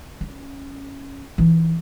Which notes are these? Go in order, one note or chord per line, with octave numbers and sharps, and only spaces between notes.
C#4
E3 D#4